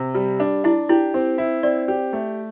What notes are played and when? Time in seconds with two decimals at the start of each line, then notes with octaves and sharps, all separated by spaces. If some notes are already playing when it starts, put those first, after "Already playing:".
Already playing: C3
0.14 G3
0.40 D4
0.64 D4 E4
0.89 E4 G4
1.14 C4
1.38 E4
1.63 C4 D5
1.88 G4
2.13 A3